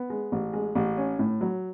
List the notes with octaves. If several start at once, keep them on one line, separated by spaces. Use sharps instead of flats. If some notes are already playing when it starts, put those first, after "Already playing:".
Already playing: B3
G#3
A1
G#3
A1
C#4
A2
F#3